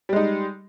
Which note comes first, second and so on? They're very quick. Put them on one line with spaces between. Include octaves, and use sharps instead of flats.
G3 G#3 D#4